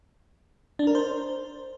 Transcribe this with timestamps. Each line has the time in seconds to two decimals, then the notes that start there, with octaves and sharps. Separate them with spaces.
0.79 D4
0.87 A#4
0.95 C5